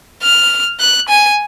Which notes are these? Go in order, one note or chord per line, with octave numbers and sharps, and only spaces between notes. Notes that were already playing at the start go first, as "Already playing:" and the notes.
F6
F#6
G#5